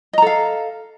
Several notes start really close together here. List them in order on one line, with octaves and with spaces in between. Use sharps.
D#5 A#5 A4 F5